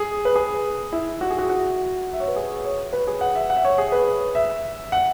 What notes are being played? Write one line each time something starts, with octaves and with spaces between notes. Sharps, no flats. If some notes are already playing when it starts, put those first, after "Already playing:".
Already playing: G#4
B4
G#4
E4
F#4
G#4
F#4
F#4
E5
C#5
B4
G#4
C#5
B4
G#4
F#5
E5
F#5
E5
C#5
G#4
B4
E5
F#5